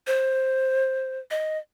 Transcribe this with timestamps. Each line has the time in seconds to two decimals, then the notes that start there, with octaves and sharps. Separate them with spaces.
0.07 C5
1.31 D#5